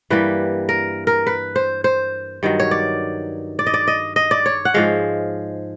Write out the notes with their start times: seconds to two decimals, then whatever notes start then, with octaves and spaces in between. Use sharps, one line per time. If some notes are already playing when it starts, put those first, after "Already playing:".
0.10 G2 E3 G3 A#3 B4
0.69 A#4
1.07 A#4
1.27 B4
1.56 C5
1.84 C5
2.43 G2 D#3 F#3
2.60 C#5
2.71 D5
3.59 D5
3.66 D#5
3.74 D5
3.88 D#5
4.16 D#5
4.31 D5
4.46 C#5
4.65 F#5
4.74 G#2 F3 G#3 F5